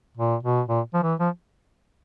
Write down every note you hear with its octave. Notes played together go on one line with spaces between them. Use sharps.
A#2
B2
A#2
F3
E3
F3